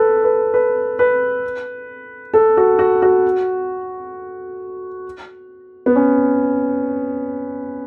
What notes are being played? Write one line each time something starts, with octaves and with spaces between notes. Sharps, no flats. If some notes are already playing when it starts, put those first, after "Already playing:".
Already playing: A4 B4
B4
B4
B4
A4
F#4
F#4
F#4
B3
C#4